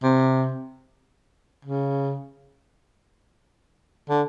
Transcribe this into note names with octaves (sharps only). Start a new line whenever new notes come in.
C3
C#3
D3